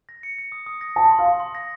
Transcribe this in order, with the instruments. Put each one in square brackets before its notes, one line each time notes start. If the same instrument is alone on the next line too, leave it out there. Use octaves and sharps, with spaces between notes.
[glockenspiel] A#6
C#7
C#7
D#6
D#6
A#6
[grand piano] A5 [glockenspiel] D#6
[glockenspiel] C6
[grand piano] F5
[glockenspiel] C6
C6
A#6